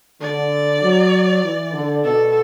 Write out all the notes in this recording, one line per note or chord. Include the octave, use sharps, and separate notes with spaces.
D3 D5
F#3
E3
D3
B2 A4